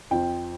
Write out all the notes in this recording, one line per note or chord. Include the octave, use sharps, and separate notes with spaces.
F2 F3 G5